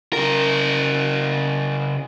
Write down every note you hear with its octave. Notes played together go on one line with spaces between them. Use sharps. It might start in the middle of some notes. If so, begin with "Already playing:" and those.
C#3 A#4